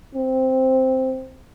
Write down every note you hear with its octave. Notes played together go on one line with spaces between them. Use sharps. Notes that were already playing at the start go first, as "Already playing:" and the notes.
C4